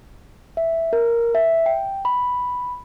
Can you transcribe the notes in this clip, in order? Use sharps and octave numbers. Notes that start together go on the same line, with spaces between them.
E5
A#4
E5
G5
B5